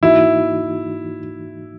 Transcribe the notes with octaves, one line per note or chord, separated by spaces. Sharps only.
G#2 E3 A#3 D#4 E4 F#4